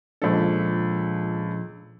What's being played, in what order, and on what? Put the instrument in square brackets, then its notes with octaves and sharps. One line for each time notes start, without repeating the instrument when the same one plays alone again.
[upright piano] C#2 A4 [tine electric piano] A#2 F3 D4